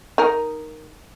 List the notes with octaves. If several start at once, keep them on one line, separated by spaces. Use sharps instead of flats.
D#4 A#4